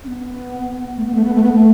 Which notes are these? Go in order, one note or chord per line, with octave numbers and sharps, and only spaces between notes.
C#4
B3
A3
B3
A3
B3
A3
B3
A3